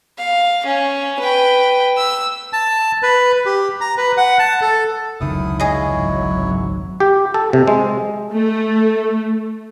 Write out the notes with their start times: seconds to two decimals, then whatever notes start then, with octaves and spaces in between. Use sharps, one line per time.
0.18 F5
0.66 C#4
1.19 B4 G5
1.97 E6
2.53 A5
3.02 B4
3.46 G4
3.81 A#5
3.97 B4
4.17 F#5
4.39 A5
4.61 A4
5.21 F1 C#2 D#3 F#3 E4 D#6
5.60 E4 G#4 C#5 D#5
5.93 G#1 F#3
7.00 G4
7.34 A4
7.53 C3
7.67 G#3
8.31 A3